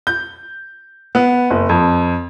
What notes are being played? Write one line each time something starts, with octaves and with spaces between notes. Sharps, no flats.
G6
B3
F#1
F2